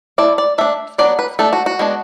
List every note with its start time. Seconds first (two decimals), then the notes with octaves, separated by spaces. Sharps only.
0.18 A3 E4 D5
0.38 D5
0.58 A3 D4 E5
0.98 F#3 B3 D4 D5
1.19 B4
1.39 A3 D4 A4
1.53 F#4
1.66 F#4
1.79 G#3 B3 D4